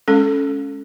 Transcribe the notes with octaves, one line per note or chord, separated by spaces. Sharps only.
G#3 C#4 A4